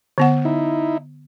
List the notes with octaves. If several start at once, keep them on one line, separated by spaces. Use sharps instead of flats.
D3 B3 F#5
D#4 E4